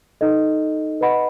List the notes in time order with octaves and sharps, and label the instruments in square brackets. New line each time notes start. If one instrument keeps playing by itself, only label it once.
[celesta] D#4 A4 D#5
B4 D#5 F#5 B5